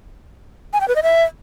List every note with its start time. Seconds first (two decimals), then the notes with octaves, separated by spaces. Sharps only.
0.73 G#5
0.81 G5
0.88 B4
0.96 D#5
1.03 E5